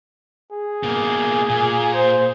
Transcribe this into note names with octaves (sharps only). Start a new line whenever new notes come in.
G#4
B2 A#3
A#2
C5